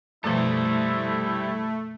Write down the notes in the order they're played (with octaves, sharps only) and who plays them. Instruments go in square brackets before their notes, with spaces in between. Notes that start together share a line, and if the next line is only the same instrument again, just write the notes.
[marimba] F#2 B2 F3 [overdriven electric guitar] G3 C5 [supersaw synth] A3 [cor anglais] E4